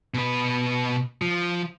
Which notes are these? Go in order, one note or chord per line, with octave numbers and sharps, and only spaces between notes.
B2 B4
F3